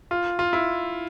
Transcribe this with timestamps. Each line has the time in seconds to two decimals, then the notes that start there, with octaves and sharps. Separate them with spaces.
0.11 F4
0.39 F4
0.53 E4